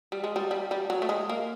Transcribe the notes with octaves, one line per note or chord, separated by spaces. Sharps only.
G3
G#3
G3
G3
G3
F#3
A3
G#3
A#3